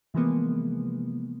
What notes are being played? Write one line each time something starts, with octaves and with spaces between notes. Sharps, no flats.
C3 E3 F3 G#3 A#3 B3